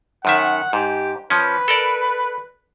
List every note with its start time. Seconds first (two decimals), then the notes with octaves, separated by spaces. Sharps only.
0.25 F#2 D#3 E5 F#5
0.73 G#2 G4
1.30 F3 C#4 B4
1.68 A4 A#4 D5